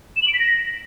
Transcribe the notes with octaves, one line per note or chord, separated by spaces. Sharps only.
E7
F#7
D7
B6
A#6